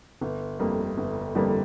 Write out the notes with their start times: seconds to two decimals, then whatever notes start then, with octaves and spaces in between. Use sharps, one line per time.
0.21 G1
0.59 F2 D3 G3 A#3
0.97 G1
1.35 F2 D3 G3 A#3